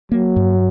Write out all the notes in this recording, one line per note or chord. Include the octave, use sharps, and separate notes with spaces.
F#3 A#3
G2